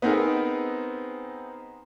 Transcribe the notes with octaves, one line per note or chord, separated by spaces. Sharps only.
B3 C4 D#4 G#4 A#4